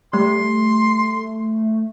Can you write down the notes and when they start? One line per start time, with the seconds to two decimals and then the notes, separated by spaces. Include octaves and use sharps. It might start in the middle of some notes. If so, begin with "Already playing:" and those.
0.13 G3 A3 C6